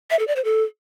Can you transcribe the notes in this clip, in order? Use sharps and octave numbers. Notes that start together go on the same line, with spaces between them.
E5
A4
D5
C5
A4